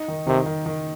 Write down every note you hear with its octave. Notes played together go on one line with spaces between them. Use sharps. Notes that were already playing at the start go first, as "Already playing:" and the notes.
Already playing: D#4
D#3
C3 D#3
D#3
D#3